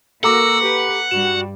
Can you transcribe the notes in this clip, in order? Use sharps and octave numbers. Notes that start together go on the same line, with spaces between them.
A#3 F#4 A4 A#4 F#5 A#5 D6 E6
G4 B4
G2 G3 F#4 E7